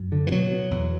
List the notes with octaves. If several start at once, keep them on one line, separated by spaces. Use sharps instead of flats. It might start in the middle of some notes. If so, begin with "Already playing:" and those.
Already playing: F#2
D3
E3
B2 F#3
B2
E2